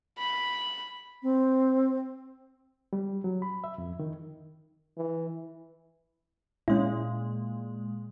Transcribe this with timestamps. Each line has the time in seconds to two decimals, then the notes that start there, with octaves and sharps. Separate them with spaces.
0.18 B5
1.22 C4
2.93 G3
3.24 F#3
3.42 B5
3.64 E5
3.78 F2
3.99 D#3
4.97 E3
6.68 A#2 G#3 C#4 E4